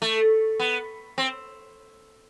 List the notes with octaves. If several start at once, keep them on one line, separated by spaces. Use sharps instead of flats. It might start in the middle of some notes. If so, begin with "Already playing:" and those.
A3
B3
C4